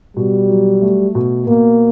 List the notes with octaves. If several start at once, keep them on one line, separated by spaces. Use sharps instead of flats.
B2 G3
F#3
A3
B2
B2 A#3